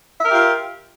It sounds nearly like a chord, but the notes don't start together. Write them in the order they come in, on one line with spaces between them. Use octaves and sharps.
E5 A#4 G4 F4